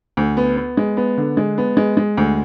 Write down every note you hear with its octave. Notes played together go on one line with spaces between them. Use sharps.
D2
B3
B3
G#3
B3
D3
G#3
B3
G#3
G#3
D2